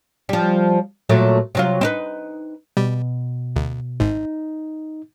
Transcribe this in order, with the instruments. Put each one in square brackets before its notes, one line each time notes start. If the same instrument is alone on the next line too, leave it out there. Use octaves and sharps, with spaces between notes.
[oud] F3 G3
A#2 F#3 A3
C3 F#3 F4
C4 D#4 B4
[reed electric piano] B2 [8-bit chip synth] G3
[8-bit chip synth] D2
[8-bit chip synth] G#1 G#2 [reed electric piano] D#4